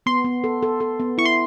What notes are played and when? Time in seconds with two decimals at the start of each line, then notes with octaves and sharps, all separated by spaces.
0.06 B3 C6
0.25 B3
0.44 A4
0.63 A4
0.80 A4
1.00 B3
1.18 E4 C#6
1.25 C6